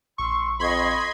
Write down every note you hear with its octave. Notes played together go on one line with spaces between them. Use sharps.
A#1 C6 C#6 E6
F2 D#5 B5 C6 G#6